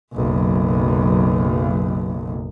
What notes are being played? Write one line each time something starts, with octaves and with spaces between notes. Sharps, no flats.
F#1 B1